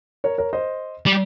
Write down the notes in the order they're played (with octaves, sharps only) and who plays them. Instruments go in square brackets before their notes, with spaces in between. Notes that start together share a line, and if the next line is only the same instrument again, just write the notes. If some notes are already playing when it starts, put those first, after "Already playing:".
[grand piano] A#4 C#5
A#4 C#5
C5 D#5
[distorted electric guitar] G3